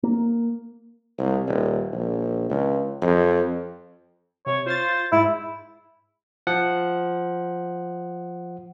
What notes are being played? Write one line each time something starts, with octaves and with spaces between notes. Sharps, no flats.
A#3
C2
D#1
A#1
C#2
F2
C3 C#5
F4 C5 C6 A6
G#2 E4
F3 F#5